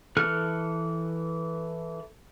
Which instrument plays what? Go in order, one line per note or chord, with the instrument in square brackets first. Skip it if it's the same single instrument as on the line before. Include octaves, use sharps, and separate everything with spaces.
[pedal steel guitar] E3 A4 F6 F#6